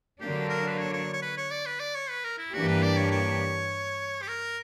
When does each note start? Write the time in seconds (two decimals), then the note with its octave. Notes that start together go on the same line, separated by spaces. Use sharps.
0.20 D3 F#3 A#3 D4 G4
0.49 A#4
0.67 B4
0.78 C#5
0.93 C#5
1.13 C#5
1.22 B4
1.37 C#5
1.51 D5
1.66 B4
1.80 D5
1.95 C#5
2.10 B4
2.24 A#4
2.38 E4
2.53 G2 E3 A#3 D4 F#4 G4
2.67 B4
2.83 D5
2.97 C#5
3.11 C#5
4.22 G4
4.28 A#4